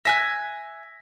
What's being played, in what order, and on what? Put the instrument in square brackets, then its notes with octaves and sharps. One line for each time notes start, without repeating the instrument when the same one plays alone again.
[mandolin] E5 G#5 F#6 [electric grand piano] A#6 B6